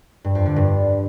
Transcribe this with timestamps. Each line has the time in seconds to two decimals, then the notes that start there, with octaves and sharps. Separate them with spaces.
0.24 G2
0.35 F2
0.46 D3
0.56 G2